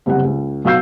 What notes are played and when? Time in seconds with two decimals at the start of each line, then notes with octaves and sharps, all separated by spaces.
0.06 F#1 C2 G3 F#5
0.24 C#2
0.65 B1 F#4 F5 E6 G6 C7